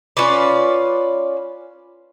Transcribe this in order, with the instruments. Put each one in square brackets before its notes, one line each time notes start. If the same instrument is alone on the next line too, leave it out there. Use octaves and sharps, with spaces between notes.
[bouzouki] C#4 F4 B4 D5